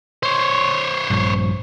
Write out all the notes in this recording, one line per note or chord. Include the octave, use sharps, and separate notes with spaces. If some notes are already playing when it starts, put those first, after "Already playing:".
C5 C#5
A#1 G2 F3